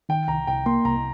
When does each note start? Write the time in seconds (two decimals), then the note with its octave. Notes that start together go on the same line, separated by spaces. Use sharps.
0.09 D#3 G5
0.28 C2 A#5
0.47 C2 G5
0.66 A#3 C6
0.85 C2 A#5